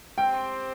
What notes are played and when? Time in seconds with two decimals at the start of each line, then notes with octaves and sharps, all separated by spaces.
0.18 C4 G4 C5 G5